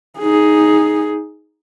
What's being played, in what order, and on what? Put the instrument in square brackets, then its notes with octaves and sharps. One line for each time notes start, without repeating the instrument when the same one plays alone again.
[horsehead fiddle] D#4 G#4